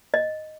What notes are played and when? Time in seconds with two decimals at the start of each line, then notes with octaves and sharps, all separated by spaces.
0.14 D#5